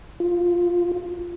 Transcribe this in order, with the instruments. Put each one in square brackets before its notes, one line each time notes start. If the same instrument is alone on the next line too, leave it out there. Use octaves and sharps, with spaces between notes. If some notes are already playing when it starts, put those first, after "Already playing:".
[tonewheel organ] F4